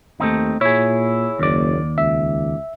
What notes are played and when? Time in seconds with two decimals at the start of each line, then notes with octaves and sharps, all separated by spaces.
0.20 D#2 A3 C4 D#4
0.61 A#2 E4 G#4 C#5
1.39 F#1 D#2 D5
1.98 C#2 E5